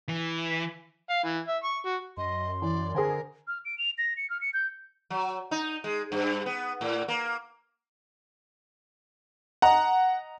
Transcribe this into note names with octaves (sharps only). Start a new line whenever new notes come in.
E3
F5
E3
E5
C#6
F#4
F#2 D#5 C6
E3 D5
D3 G#4 A#4 C5 G#5
F6
D7
F7
A#6
C#7
F6
C#7
G6
F#3
D#4
G#3
G2
B3
A2
A#3
D#5 F#5 A#5